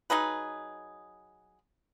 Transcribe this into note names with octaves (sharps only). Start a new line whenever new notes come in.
F#3 D#4 G#4 B4